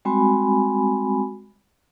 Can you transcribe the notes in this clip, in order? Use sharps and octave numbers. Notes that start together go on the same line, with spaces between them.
G3 G#3 C4 F#4 G#5 B5